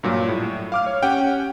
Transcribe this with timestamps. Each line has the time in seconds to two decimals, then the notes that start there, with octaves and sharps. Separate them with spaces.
0.03 G2 A#2 F#3
0.28 A2
0.72 F5 D6 F6
0.86 C#5
1.03 C#4 G4 F#5 G5